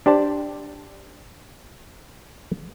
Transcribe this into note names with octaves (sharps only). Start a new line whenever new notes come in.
D4 G4 C5 D5 A5